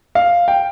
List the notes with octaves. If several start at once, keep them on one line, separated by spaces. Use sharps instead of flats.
F5
G5